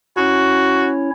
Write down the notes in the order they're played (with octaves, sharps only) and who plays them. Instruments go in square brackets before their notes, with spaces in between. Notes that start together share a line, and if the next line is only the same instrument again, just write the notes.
[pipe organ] C#4 E4 C#5 [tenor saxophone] F#4